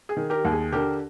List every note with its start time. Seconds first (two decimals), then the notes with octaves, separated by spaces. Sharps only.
0.09 G#4
0.17 D#3
0.30 G4 A#4
0.45 D#2
0.52 G#4
0.72 D3 G4 A#4